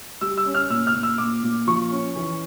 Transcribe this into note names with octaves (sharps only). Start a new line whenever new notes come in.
G3 E6
E6
C#4
F6
A#2 E6
F6
A#2
E6
A#2 D6
A#2
F3 C#6
C#4
E3